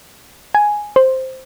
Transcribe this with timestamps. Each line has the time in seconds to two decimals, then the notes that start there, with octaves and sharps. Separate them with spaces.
0.55 G#5
0.96 C5